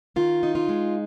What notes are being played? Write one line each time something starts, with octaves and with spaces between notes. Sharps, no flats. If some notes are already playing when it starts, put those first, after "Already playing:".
D#3 F4
D#4
F4
G#3